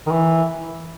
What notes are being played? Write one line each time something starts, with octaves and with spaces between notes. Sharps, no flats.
D#3
E3